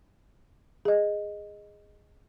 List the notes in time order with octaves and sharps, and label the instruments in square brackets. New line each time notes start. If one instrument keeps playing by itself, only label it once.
[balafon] G#4 D#5